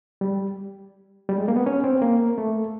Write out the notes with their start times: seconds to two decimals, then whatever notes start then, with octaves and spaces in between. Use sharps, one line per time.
0.21 G3
1.29 G3
1.38 G#3
1.48 A#3
1.56 B3
1.66 C#4
1.84 C4
2.02 A#3
2.38 A3